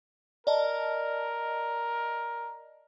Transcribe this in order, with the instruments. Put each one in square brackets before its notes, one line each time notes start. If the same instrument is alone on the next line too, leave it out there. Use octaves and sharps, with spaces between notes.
[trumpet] A#4 [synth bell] D5 D#5 A5